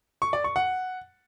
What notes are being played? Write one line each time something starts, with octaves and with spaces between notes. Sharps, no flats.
C#6
D5
C#6
F#5